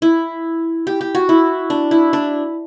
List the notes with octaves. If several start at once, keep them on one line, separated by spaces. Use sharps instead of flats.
E4
G4
G4
F#4
E4
D4
E4
D4